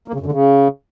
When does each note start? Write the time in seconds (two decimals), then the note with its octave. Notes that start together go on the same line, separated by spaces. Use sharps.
0.08 A#3
0.14 C#3
0.20 F#2
0.26 D3
0.32 C#3